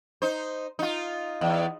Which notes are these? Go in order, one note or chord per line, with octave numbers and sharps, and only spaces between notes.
D#4 C5
D#4 F4
E2